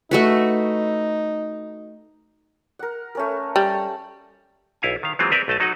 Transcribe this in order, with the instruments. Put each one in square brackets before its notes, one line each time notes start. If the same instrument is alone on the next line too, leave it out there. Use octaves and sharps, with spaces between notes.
[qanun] A3 F#4 B4 [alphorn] D#4
[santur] A#4 F#5
A3 C#4 A#4
[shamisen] G3 [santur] A5
[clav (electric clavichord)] B1 E4 F5 G#5
D#3 F5
E3 F#3 G#3 A#3 C4 F4
C4 A#4 B4 D5 E5
B1 A3 D#5 A5
F#3 D#4 F#4 D#5 F#5